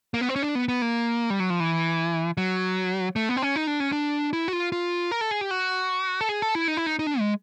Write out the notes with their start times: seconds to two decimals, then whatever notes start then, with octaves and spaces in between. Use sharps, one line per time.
0.14 A#3
0.21 B3
0.29 C4
0.36 C#4
0.42 D4
0.55 B3
0.68 B3
0.82 A#3
1.30 G3
1.40 F#3
1.50 F3
1.60 E3
2.37 F#3
3.16 A3
3.29 B3
3.36 C4
3.42 C#4
3.56 D#4
3.67 D4
3.80 C#4
3.92 D4
4.33 E4
4.48 F#4
4.53 F4
4.72 F4
5.11 A#4
5.21 A4
5.31 G#4
5.41 G4
5.51 F#4
6.21 A4
6.29 G#4
6.42 A4
6.55 E4
6.68 D#4
6.77 E4
6.86 D#4
6.99 D#4
7.07 D4
7.19 G#3